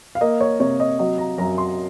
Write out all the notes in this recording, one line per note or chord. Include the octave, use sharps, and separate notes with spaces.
F5
A#3 D#5
C#5
C3 C#5
D#5
F#3 D#5
A#5
F#2 A#5
C6